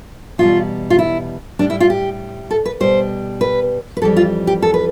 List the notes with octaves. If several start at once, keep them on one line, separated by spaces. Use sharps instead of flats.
E2 B2 G3 F4
F4
E4
A2 G3 D4
E4
F4
G4
A4
B4
B2 G3 C5
B4
B4
F2 E3 G3 A4
F4
G4
A4
B4